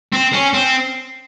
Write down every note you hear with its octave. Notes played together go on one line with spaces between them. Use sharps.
C4
C#4
C4